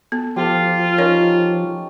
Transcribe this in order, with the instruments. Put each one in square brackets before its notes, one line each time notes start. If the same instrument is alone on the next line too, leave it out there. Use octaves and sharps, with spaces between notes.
[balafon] B3 [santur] A4
[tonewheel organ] F3 [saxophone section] F4 [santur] G4 A4
[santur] C#4 D#4 [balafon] A#4 C#5